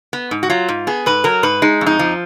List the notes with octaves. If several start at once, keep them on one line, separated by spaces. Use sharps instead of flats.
B3
G#2
F#4
F#3 F4
G#2
B3 G#4
G#2 B4
F#3 A#4
G#2 B4
G#3 D#4
F2
D#4
F3